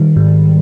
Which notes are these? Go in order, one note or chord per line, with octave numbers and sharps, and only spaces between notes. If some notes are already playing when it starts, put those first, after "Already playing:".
Already playing: D#3 G3
G#2